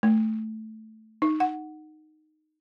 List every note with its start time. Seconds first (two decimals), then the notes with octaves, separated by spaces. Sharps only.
0.03 A3
1.22 D#4
1.40 F#5